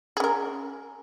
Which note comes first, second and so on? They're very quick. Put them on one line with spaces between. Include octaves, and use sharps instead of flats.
G#4 C#4 A#4